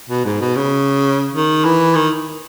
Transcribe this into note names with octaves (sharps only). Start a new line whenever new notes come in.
B2
G#2
B2
C#3
D#3
E3
D#3